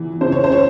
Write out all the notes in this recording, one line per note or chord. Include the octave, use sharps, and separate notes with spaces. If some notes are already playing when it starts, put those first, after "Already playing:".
Already playing: E2 E3
C#3 C5
C#5
C5
C#5